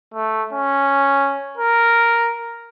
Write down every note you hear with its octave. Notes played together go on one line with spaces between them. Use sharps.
A3
C#4
A#4